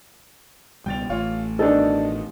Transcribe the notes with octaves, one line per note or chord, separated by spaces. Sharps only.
C#2 B2 G3 G5 A6 F7
A1 A2 F4 C#5
B2 D#3 D4 D#4 A4